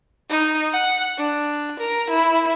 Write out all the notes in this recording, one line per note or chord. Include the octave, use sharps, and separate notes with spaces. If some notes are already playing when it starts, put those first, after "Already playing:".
D#4
F#5
D4
A#4
E4